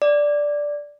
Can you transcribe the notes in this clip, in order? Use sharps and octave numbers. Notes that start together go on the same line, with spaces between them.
D5